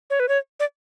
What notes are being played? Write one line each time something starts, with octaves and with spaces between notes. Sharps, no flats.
C#5
B4
C#5
D5